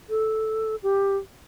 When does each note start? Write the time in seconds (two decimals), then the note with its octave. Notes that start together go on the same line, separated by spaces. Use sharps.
0.09 A4
0.83 G4